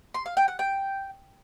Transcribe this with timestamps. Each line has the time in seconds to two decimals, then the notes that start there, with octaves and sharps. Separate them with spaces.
0.14 C6
0.26 F5
0.37 G5
0.48 F#5
0.59 G5